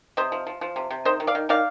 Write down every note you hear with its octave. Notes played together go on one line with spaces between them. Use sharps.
C3 C5 D#5
F3
F3
F3
C3
C3
D#3 C5 D#5
D#3
D5 F5
D#3
D#3 D5 F5